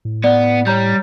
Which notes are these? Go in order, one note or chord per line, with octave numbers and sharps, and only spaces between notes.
A2
B3 D5
G3 C#5 A#5 G6